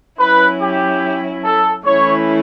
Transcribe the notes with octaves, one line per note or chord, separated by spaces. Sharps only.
F#3 C#4 E4 B4
G4
A4
E3 A3 C#4 E4 C#5